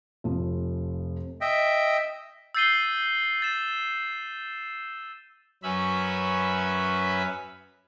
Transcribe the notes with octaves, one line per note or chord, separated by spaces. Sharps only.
F1 F3
D#5 E5 G5
E6 G6 A6 C7 D#7 G7
A6 E7
F#2 C#4 B4 E5 B5